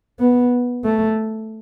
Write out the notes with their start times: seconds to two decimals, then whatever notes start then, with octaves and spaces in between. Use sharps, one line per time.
0.19 B3
0.84 A3